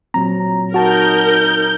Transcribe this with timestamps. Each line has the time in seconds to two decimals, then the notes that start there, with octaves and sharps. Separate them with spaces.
0.14 A#2 F#3 C4 A#5
0.74 D#4 F#4 A#4 A5 G6